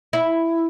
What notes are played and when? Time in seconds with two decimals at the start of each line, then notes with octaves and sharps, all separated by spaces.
0.13 E4